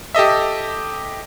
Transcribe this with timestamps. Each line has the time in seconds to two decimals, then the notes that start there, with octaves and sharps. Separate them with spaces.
0.14 G4 A4 D#5 E5